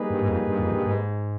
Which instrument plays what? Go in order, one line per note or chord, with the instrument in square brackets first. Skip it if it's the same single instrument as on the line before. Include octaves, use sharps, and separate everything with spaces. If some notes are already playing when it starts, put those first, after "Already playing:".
Already playing: [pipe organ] G3 A#3 D#4 G#4 B4
[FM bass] G2
G#2
F2
G2
F2
G2
G#2